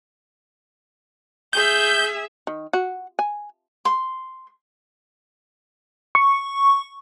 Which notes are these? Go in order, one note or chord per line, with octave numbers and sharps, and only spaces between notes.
G#4 E5 G6
D#3
F#4
G#5
C6
C#6